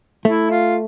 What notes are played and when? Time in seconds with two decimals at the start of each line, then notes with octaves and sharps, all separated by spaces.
0.25 A3 E4
0.50 F4